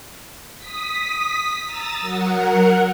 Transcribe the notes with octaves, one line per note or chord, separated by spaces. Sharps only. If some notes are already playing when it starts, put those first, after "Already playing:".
D#6 B6
A#5 D#6 E6 A6
F#3 A#4 F#5